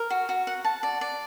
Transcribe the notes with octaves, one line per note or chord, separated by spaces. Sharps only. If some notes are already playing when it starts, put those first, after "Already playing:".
Already playing: A#4
F#4
F#4
F#5
A5
D5
D5